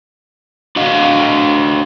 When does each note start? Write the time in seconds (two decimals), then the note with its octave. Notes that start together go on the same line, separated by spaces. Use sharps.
0.76 D4 F#4 D#5 F5